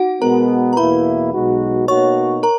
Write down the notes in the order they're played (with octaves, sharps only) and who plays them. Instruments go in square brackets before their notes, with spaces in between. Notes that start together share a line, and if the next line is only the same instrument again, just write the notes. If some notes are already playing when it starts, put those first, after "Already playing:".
Already playing: [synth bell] D#4 F#4 F#5
[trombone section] B2 G#3 B3 [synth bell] A#4 A#5
[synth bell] A#5
[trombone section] E2 B2 A#3 E4 [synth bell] B4 B5
[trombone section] B1 B2 G#3 D#4 F#4
[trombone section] B2 A#3 D#4 F#4 [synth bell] C#5 C#6
[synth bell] A#4 A#5